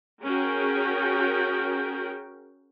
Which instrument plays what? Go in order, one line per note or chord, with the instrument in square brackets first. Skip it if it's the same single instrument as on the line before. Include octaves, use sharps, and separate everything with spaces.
[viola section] C#4 F#4 G#4 A#4 G5